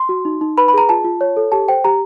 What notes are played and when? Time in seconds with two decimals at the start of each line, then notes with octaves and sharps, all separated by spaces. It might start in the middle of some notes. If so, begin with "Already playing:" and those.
Already playing: C6
0.09 F#4
0.25 D#4
0.41 D#4
0.58 B4 B5
0.68 B5
0.74 G#4 A#5
0.89 F4 A5
1.04 F4
1.21 C#5
1.37 A4
1.52 G4 A5
1.68 C5 G5
1.84 G4 A#5